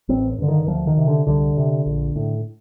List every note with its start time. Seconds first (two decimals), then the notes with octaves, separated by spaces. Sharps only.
0.09 A1 C4
0.38 G2 D3
0.48 D#3
0.67 D2 F3
0.87 D#3
0.98 C3
1.08 D3
1.27 C2 D3
1.57 C3
1.86 A#1
2.16 A2